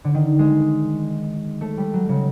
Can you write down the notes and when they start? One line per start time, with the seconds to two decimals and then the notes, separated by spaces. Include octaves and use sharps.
0.05 D3
0.14 D#3
0.39 G#3
1.61 A3
1.77 G3
1.94 F#3
2.09 C#3